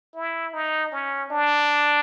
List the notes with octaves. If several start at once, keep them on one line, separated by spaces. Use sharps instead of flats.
E4
D#4
C#4
D4